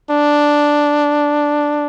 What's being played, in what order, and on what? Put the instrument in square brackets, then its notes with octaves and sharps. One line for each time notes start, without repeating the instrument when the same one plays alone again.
[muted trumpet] D4